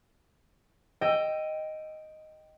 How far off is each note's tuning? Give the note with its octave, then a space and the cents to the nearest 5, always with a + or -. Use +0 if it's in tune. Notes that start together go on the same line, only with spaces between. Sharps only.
D#5 +0 G5 -5 E6 +20